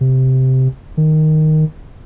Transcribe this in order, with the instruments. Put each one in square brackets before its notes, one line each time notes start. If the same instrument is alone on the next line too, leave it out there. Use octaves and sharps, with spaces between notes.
[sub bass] C3
D#3